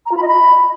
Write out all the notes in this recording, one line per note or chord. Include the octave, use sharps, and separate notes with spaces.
A#5
F4
B5
D#5
B5